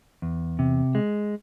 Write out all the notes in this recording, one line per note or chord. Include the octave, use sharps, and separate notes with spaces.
E2
C3
G#3